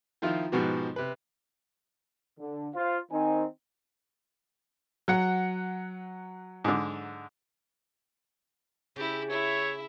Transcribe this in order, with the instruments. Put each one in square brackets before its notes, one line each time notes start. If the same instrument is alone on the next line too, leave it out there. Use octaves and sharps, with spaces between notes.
[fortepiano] D#3 F3 E4 F4
G#2 B2 F3 B3 F#4 G4
C3 B4
[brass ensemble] D3
F4 C5 F5
D#3 C4 D#4 G#5
[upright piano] F#3 F#5
[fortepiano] G#2 D3
[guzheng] C#3 [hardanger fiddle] E4 G4
[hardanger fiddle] E4 E5 [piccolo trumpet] C#5